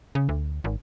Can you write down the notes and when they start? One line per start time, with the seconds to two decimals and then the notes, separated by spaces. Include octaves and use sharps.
0.15 C#3
0.29 D2
0.64 G#1